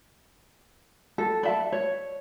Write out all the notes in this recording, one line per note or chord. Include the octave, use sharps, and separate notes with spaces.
A4
D5 E5 A5
C#5